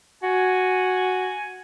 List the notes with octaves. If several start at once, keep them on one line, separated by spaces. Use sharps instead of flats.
F#4 G#5